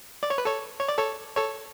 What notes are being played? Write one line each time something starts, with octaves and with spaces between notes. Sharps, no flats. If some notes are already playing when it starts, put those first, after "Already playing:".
D5
C#5
B4
A4 C#5
C#5
D5
A4 C#5
A4 C#5